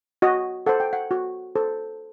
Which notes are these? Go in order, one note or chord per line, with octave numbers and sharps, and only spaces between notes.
F#4 D#5
A4 C5 F#5
G5
F#5
F#4
A4 C5